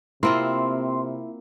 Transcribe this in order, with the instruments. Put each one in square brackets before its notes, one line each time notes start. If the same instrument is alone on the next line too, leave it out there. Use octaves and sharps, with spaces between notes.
[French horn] C3 [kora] A#3 C4 F4 [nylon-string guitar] E4 [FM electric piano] C6